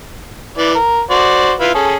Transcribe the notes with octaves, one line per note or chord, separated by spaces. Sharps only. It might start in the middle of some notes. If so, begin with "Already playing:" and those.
E3 D5
A#4
F#4 C5 D5
E4 F4 B4
C#4 G#4 A4